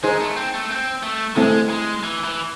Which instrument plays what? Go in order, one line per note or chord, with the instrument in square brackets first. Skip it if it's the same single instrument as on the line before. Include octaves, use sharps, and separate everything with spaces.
[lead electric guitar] G#3 [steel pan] D#4 G#4 C5
[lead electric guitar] A3
C4
A3
C4
A3
[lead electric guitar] G#3 [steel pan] A3 C4 E4 A4
[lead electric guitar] G#3
E3
E3